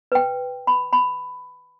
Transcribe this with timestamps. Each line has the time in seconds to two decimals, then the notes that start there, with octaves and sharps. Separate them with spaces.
0.12 B4 G5
0.67 B5
0.93 B5